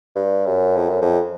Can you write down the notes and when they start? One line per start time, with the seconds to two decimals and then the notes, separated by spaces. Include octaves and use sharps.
0.15 G2
0.46 F#2
0.77 F2
0.89 F#2
1.02 F2